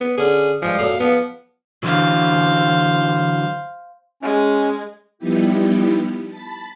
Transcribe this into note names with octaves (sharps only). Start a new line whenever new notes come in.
B3
D3 C#4 G#4
G2 F3 G#3
F#2 A#2 A3 F5
F3 B3
D3 E3 F#3 C5 F5
G#3 C#4
F3 G3 B3 D#4 E4 G4
A5 B5